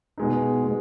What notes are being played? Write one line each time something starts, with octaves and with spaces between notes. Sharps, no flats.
B2 G#3 D#4
B2 G#3